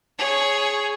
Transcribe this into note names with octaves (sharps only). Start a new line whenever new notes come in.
G#4 C#5